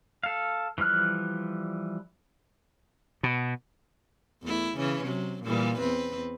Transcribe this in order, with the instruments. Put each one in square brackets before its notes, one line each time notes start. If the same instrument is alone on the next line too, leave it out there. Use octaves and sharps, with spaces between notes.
[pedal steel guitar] A4 F5
E3 F3 G3 F6 F#6
[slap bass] B2
[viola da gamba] E2 A3 E4
C#3 E3 C#4
C3 F#3
A#2 E3 G3
E2 C4 B4